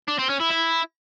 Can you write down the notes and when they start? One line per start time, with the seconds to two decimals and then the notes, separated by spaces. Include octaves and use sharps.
0.08 D4
0.19 C4
0.30 C#4
0.41 E4
0.52 E4